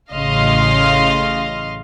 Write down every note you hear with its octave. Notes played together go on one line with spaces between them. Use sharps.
A1 C#3 D#5 F5 C6